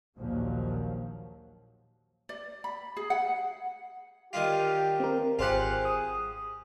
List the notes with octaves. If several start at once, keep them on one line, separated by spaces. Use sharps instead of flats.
A#1 D#2 A#2 F3 F#3
D5
B5
G#4
F#5
D#3 D4 F4 G4
C4 A#4
G#1 F4 G4 G#4 C5 F#5 F#6
D#6